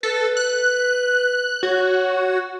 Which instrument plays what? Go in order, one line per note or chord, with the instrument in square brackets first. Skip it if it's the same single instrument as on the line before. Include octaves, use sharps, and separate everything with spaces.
[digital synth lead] A4 [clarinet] B4
[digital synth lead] F#6
[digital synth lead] F#4 [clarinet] C#5